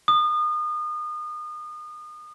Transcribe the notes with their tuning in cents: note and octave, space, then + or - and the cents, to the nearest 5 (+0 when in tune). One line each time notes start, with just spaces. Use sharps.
D#6 -35